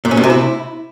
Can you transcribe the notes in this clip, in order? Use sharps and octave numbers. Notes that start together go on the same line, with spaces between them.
A#2
C#4
B2
C3
E4